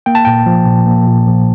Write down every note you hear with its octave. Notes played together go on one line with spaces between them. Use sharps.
A#3 G5
A5
A#2 G5
F3
A#2
A#3
A#2
F3